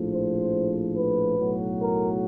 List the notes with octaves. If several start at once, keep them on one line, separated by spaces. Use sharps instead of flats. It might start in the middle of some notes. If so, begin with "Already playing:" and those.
Already playing: A#1 A2 F3
C5
B4
B1 A2 F#3
A#4